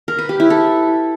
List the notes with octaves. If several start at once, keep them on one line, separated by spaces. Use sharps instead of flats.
A#4
B4
G4
E4
A4